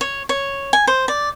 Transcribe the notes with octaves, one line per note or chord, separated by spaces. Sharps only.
C#5
C#5
G#5
C5
D5